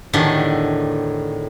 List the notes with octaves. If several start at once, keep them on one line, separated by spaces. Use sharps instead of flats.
E2 A2 D3 D#3 G4